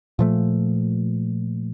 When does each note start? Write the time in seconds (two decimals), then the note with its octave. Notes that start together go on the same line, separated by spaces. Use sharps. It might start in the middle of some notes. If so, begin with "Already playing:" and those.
0.19 A#2 F3 A3